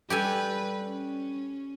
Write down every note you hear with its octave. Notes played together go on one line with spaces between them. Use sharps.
G3 G4 A4 B4 G#5
C#4